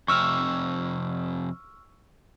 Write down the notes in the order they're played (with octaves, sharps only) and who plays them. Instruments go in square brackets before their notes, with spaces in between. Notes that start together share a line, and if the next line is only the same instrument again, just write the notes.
[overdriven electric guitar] F2 C3 [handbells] C#6 E6 F6